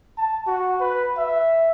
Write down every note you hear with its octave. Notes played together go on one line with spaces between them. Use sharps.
A5
F#4
B4
E5